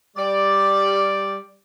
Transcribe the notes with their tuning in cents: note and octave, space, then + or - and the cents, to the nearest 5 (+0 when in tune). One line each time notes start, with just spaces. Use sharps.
G3 +5 D5 +0